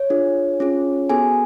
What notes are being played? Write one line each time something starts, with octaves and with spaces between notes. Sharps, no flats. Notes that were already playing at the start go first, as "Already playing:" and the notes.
Already playing: C#5
D4 F4 G#4
C#4 F4 G#4
B3 F#4 G#4 A4 G#5